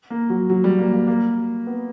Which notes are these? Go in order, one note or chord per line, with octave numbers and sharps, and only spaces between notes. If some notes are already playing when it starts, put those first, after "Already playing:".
A#3
F#3
F#3
G3
A#3
A#3
A#3
B3